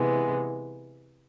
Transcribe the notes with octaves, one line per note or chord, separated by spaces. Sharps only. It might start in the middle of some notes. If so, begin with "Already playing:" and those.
Already playing: C3 E3 G#3 B3